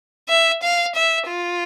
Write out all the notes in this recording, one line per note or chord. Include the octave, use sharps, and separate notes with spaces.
E5
F5
E5
F4